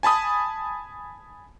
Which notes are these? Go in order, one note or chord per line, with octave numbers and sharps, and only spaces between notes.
G#5 A5 B5 D#6